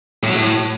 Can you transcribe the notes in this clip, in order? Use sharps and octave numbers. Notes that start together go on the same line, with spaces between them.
A2
F#3
A2